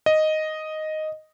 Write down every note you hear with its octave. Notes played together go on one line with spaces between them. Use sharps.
D#5